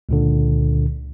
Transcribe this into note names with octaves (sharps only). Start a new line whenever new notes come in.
C#2 A#2 D3